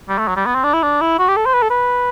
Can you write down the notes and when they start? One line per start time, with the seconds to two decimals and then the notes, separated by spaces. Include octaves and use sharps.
0.09 G3
0.18 A3
0.28 F#3
0.36 G3
0.46 B3
0.55 C4
0.64 D4
0.73 E4
0.83 D4
1.01 E4
1.19 F#4
1.28 G4
1.37 A4
1.46 C5
1.54 B4
1.62 A4
1.70 B4